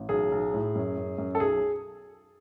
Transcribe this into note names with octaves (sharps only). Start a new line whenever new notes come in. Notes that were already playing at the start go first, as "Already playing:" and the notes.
Already playing: A1
B1 G#4
B1
A2
F#2
F#2
F#2
A4
B1 G#4